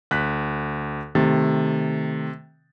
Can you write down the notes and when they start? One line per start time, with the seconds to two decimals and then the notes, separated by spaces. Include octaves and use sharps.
0.11 D2 F#6 B6
1.15 C3 D#3 A3 A6